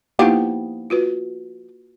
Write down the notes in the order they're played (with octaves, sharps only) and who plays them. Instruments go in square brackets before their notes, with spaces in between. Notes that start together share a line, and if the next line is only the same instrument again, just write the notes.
[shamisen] F3 B3 G4 [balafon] A#3 D#4 E4
[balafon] F4 F#4 B4